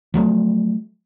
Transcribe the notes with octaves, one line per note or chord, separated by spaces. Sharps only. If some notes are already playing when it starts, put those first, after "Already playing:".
F3 F#3 A3